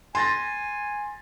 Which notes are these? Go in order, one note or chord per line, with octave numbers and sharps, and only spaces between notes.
G#5 C6 A6 A#6